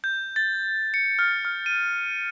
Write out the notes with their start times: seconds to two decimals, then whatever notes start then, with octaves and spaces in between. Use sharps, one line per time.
0.04 G6
0.36 A6
0.94 C#7
1.19 F6
1.45 F6
1.66 D#7